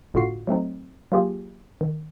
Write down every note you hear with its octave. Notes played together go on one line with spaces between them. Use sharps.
G1 A2 D3 F4 F#4 C7
F#3 A3 C4 D#4
F#3 A#3 F4 G4 G#4
D#3